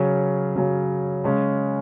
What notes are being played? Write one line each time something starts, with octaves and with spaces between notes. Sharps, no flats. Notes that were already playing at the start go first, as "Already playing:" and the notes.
Already playing: C#3 F#3 C#4
C#3 F#3 C#4
C#3 G#3 C#4